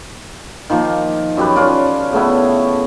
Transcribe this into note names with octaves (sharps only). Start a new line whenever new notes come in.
D#3 F3 A#3
F#2 G4 B4
C#4 F4 A4 D5
C#3 A3 B3 E4